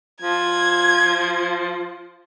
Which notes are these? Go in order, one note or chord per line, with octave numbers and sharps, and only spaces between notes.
F3 G#6